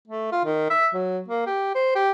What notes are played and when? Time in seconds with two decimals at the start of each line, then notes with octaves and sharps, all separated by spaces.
0.08 A3
0.32 F4
0.45 D#3
0.70 E5
0.94 F#3
1.28 A#3
1.46 G4
1.75 C5
1.95 G4